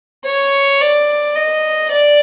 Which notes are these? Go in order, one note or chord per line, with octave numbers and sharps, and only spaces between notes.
C#5
D5
D#5
D5